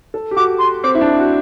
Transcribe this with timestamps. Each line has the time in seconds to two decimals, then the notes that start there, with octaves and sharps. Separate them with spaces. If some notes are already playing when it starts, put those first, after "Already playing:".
0.14 A4
0.31 G4
0.36 F#4 D6
0.60 C6
0.83 C4 D6
0.95 E4
1.01 D4
1.19 F#4